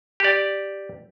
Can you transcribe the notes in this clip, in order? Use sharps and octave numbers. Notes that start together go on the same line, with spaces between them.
G4 D5